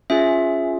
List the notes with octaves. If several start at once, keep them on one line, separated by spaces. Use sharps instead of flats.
C#4 F4 G#4 E5